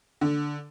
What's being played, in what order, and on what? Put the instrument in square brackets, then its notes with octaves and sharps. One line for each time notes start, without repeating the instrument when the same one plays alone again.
[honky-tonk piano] D3